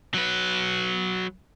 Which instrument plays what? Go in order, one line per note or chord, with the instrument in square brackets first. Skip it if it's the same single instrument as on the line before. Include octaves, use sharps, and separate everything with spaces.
[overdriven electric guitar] F#3 B4